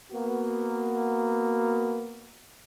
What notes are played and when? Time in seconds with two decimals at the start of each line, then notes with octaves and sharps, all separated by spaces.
0.12 A#3 B3 F#4